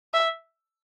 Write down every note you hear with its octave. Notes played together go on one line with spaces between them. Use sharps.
E5